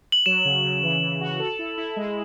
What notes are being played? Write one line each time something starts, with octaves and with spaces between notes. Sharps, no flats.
F#7
F#3 E7
C#3
C#3
E3
E3
F#4
A4
E4
E4
G#3